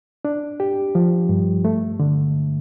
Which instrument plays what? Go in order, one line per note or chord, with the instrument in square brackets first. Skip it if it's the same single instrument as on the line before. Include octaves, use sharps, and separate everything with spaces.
[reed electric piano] D4
G4
F3
G2
A3
D3